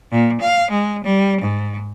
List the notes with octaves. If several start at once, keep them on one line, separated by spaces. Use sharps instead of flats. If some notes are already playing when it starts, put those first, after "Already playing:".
A#2
F5
G#3
G3
G#2